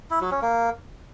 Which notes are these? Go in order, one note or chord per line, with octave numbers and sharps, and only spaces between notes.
E4
F#3
C#4
A#3